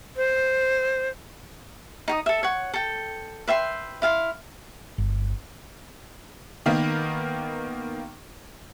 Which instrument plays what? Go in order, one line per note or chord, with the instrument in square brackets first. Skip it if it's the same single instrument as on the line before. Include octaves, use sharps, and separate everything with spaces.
[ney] C5
[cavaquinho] D#4 G5 D#6
A4 E5
C#5 F#5
A4 G5
B4 E5 G5 C6
E4 F5 G#5 C6
[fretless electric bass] G1
[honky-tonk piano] D#3 A#3 B3